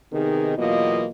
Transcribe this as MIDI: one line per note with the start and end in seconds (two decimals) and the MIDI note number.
0.12 0.57 48
0.12 0.57 51
0.12 0.57 59
0.12 0.57 63
0.12 0.57 68
0.12 0.57 70
0.58 1.07 40
0.58 1.07 47
0.58 1.07 54
0.58 1.07 58
0.58 1.07 65
0.58 1.07 75